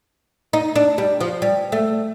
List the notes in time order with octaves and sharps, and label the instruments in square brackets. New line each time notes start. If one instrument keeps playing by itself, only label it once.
[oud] D#4
D4
G3
F3
G3
A3